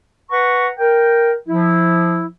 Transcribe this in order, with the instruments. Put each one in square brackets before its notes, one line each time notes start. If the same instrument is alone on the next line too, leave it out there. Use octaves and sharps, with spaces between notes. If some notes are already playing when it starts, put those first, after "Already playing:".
[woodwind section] B4 F#5 A#5 C#6
A#4 G5
F3 E4